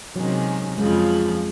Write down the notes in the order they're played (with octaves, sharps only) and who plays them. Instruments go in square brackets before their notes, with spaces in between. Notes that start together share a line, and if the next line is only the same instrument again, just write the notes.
[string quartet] C3 D#3 G#3 C#4 [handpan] F#3
[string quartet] F2 C#3 F3 [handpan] G#3